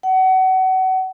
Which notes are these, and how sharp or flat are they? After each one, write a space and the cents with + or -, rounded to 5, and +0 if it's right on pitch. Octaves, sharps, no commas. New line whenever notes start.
F#5 +30